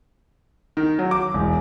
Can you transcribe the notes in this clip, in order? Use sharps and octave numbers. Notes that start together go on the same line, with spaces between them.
D#3
F#3
D6
E1